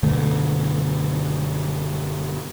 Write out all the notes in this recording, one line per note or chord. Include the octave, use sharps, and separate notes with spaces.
F#1 B2 D3 A3